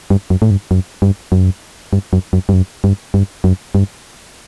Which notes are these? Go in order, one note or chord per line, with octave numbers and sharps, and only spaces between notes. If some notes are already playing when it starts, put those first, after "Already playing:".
G2
F#2
A2
G2
F#2
G2
F#2
G2
F#2
F#2
G2
F#2
G2
G2
F#2
G2